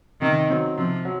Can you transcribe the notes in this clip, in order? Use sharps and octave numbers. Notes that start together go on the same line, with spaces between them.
C3 D#3
F#3 C4
C3 F3
F#3